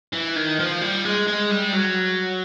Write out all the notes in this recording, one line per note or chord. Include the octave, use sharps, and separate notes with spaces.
E3
D#3
F3
G3
G#3
G#3
G3
F#3